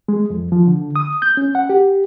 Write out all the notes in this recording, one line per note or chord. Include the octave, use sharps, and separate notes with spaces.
G#3
F2
F3
D3
D#6
G6
C#4
F#5
G4